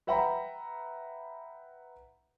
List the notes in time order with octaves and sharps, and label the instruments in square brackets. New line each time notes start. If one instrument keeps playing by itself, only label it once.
[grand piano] B4 E5 F#5 G5 A#5 B5